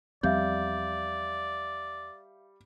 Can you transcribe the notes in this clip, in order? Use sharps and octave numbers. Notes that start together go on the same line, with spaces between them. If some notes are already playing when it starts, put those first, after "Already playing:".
E2 F3 G3 C4 D5 E5 F5 G6